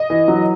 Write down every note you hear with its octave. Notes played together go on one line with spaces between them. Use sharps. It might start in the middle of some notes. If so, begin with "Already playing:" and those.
Already playing: D#5
E3
F#3